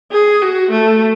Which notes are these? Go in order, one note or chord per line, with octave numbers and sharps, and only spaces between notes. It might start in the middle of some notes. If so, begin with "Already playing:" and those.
G#4
F#4
A3